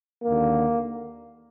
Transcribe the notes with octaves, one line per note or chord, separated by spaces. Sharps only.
D#2 D3 A#3